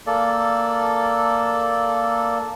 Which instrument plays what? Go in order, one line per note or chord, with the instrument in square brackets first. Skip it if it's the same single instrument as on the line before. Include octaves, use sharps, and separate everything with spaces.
[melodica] A#3 A4 D5